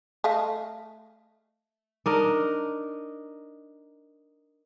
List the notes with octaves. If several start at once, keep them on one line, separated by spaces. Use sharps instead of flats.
A3 D#5 F5
D4 D#4 A#4